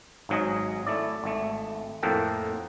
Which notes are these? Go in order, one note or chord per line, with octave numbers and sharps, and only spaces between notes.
G#1 G#2 F#3 G#4 D#5
A3 E4 D5
G#1 A3
F2 A2 A#3 A4 F#5 G5